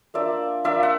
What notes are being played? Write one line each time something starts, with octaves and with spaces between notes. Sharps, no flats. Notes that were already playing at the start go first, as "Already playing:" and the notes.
A#3 D4 F4 D5 E5
A#3 D4 F4 D5 E5
F#5